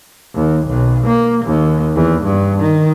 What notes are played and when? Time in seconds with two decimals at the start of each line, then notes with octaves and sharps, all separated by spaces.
0.34 D#2
0.68 B1
1.07 A#3
1.45 D#2
1.95 E2
2.24 G2
2.60 D#3